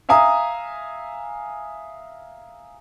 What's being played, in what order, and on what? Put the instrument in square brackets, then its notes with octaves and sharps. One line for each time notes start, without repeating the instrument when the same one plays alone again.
[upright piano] E5 F5 G#5 A#5 D#6